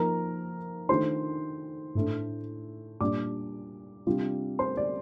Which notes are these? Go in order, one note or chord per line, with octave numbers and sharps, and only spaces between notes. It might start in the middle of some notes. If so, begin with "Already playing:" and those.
Already playing: F3 A#3 D#4 A#4 A#5
D#3 A3 D4 F4 C5 C6
A2 A3 D4
A#2 G3 D4 D5 D6
C3 G3 D4 F4
C5 C6
D5